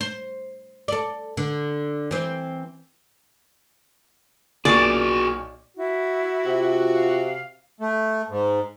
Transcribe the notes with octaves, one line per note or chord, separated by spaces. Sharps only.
C5
A4 D5
D3
E3 C4
B1 A#2 F#4 G#4 D5 C#6
E4 F#4
C3 F4
F5
A3
G#2